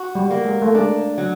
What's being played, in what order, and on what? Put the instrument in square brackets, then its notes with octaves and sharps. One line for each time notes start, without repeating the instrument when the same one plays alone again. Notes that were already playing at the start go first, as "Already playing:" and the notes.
Already playing: [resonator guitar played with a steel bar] F#4
[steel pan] G3
[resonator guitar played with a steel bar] A#3
[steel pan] G#3
A3
[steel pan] G#3 [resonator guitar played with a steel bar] D4
[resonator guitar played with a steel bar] F#3